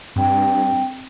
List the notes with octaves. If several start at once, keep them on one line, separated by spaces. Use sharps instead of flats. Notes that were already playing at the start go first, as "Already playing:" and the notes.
G2 C4 G5